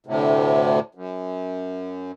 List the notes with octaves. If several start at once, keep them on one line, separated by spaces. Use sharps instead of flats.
D2 A2 C3
F#2